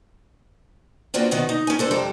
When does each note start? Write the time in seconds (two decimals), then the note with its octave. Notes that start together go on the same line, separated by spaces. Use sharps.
1.14 A#3 C4 D4 F4 F#4 B4
1.31 B2 D#3 B3 F#4
1.49 D#4
1.67 C#4 G#5
1.79 D4 A4 C5
1.91 F2 G3 A4 A#5